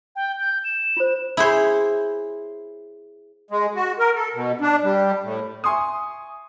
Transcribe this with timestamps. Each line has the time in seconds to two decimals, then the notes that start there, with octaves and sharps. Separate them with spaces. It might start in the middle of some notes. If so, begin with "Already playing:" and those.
0.16 G5
0.40 G6
0.64 E7
0.97 F4 C5
1.37 E4 G#4 C5 C#5
3.51 G#3
3.75 F#4
3.99 A#4
4.15 A4
4.34 B2
4.61 D4
4.83 G3
5.23 A2
5.64 E5 G#5 C6 C#6 D#6